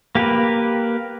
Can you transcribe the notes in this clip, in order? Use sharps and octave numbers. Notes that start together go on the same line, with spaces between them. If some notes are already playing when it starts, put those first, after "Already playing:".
A#3 G4 A#4 B4